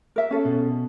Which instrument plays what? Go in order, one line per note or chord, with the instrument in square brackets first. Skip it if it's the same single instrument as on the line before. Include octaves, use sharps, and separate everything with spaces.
[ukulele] A#4 E5
C#4 A4
[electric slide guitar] B2